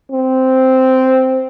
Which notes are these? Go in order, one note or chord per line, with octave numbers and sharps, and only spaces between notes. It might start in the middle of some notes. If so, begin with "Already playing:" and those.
C4